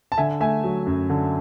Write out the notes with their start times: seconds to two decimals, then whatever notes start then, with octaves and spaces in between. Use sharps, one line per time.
0.12 A5
0.18 D3 E5 G#5
0.40 A3 E5 G#5
0.64 F#3
0.86 F#2
1.10 D3